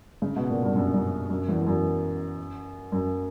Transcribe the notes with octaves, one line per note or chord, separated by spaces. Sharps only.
C#3
B2
A#2
G2
F#2
F#2
F#2
E2
E2
F#2
F#2